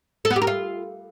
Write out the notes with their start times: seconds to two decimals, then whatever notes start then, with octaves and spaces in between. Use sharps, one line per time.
0.25 A4
0.30 B3
0.36 G4
0.42 A#4
0.47 F4